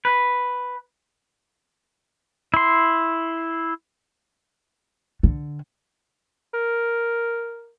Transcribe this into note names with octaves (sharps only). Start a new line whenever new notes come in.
B4
E4 C6
D3
A#4